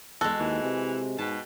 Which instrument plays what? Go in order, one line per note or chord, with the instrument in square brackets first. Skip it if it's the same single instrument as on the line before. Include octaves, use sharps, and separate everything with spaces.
[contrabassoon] E2 [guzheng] G#3 F#4 [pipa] A4
[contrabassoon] D#2 [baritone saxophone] E3
[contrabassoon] C3
[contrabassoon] G#2 [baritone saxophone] B2 [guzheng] G5 A5